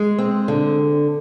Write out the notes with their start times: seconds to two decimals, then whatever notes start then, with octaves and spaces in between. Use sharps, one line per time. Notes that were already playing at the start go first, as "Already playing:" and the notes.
Already playing: G#3
0.18 C4
0.48 D3